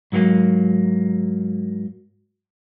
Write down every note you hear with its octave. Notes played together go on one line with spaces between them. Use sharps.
G#2 F#3 A3 A#3